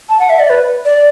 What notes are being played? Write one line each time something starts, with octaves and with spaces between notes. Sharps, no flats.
A5
F#5
E5
D5
B4
D5